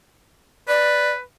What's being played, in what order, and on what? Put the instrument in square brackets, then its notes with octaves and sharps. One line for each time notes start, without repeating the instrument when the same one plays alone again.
[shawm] B4 [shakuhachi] D5